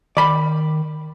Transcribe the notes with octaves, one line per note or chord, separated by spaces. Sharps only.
D#3 D5 B5